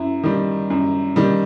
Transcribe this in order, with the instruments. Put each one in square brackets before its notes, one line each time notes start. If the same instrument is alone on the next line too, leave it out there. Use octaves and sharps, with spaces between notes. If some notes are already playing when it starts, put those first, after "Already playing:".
Already playing: [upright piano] F#2 E4
D#3 G3
F#2
D#3 G3